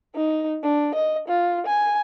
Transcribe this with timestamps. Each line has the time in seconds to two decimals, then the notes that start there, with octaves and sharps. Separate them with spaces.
0.16 D#4
0.63 D4
0.95 D#5
1.28 F4
1.67 G#5